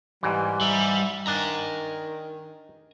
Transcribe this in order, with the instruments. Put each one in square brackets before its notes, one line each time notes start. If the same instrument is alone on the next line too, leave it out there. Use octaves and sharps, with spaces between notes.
[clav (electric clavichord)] G#2 E3 [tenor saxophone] G3
[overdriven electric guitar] G3 [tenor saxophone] E5
[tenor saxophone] D#3 [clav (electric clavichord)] D4 [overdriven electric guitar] G#5 A#5